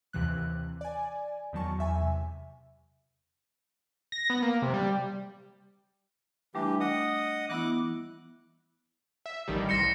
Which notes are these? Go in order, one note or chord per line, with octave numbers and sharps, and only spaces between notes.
D#2 C3 E3 F#6
D5 G#5
E2 D#3 F#3 A5 C#6
E2 E5 G#5
C3
A#6
B3
A#3
C3
G3
E3 G3 A3 D4 G4
D#5 F#5 D#6
E3 B3 E4 D6 F#6
E5
A1 D#3 G3
C2 C6 A#6 C#7 E7